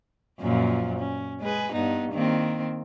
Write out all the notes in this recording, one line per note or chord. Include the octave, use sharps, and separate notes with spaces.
F#2 A#2 F3
C#4
G#3 G#4 B4
G2 B3 D#4
D#3 A#3 C4